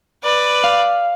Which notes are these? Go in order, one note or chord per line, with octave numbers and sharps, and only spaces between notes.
B4 D5
F5